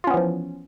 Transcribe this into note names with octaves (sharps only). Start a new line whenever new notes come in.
E3 F3 B3 C#4 F4